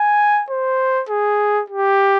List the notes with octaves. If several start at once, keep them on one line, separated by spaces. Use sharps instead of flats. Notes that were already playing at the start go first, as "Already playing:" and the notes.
Already playing: G#5
C5
G#4
G4